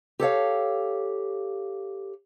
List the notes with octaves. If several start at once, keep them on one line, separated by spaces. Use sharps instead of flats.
G4 A4 C#5 F5